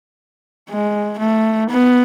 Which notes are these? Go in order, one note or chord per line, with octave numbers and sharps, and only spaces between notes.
G#3
A3
B3